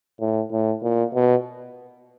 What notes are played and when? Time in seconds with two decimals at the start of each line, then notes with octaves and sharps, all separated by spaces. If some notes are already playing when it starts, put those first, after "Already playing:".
0.21 A2
0.52 A2
0.83 A#2
1.14 B2